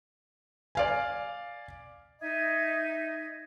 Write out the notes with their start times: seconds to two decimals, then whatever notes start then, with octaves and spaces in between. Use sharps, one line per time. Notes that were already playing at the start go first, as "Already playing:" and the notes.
0.75 D5 F5 G#5
2.20 D#4 D#5 E5 G#6